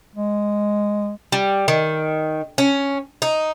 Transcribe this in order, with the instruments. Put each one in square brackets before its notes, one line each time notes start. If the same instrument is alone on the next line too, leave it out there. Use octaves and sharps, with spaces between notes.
[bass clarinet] G#3
[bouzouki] G3
D#3
C#4
D#4